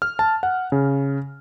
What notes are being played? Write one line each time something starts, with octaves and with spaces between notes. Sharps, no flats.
F6
A5
F#5
C#3